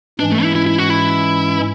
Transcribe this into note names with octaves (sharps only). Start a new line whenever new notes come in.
G#2 E3 G#3 C#4 D4
A3
E4
E4
E4
F#4
E4